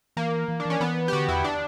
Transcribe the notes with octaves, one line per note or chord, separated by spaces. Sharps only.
E3 A#3
E3
D4
E3 C#4
E3 B3
G4
D3 F#4
E2 E4
D4